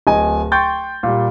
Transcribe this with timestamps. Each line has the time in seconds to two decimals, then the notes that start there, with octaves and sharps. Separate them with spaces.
0.07 D1 D#5 G#5
0.52 G5 C6 C#6 G6 A6
1.03 A#2 G3